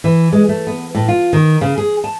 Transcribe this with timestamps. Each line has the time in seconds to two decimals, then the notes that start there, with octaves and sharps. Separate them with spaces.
0.04 E3
0.32 G#3
0.49 A3
0.67 B3
0.95 A2
1.08 F4
1.33 D#3
1.61 C#3
1.78 G#4
2.04 A5